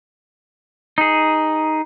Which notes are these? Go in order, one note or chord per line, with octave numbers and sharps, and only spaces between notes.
D#4 G#4